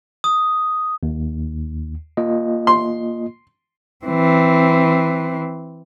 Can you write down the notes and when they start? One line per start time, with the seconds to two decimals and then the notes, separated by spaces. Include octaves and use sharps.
0.24 D#6
1.03 D#2
2.17 A#3 F4 D#5
2.67 C6
4.05 E3 C4